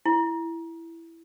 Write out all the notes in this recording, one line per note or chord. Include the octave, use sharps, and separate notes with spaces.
E4